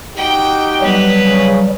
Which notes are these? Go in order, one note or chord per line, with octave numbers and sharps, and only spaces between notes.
D#4 F#4 G4 G5
F#3 G3 B3 B4
C#3